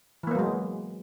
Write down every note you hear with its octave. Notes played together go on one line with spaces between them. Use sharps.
E3 F#3 G#3 A#3 B3